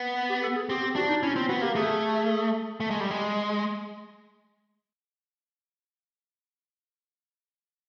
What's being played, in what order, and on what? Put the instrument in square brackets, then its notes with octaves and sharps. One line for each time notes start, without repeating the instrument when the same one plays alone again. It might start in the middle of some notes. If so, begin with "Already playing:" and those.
Already playing: [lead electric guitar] B3
[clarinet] G4
A4
G#4
[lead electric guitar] C4 [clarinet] G4
[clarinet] G4
[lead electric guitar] D4 [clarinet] F#4
[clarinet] D#4
[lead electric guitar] C#4 [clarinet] E4
[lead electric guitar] C4 [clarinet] F4
[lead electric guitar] B3 [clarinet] F#4
[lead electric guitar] A#3 [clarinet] G4
[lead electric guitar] A3 [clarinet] G#4
[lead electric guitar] A3
G#3
G3
G#3